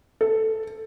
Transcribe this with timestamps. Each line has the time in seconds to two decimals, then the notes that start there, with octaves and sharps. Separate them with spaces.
0.21 A4